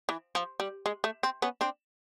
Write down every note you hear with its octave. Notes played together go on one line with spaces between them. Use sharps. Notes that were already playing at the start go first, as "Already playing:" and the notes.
E3
F3
G3
G#3
A3
C4
B3 C#4
C4 D4